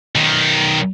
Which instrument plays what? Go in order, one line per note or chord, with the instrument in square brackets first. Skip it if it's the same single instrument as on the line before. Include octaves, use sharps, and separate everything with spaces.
[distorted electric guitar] B1 D#3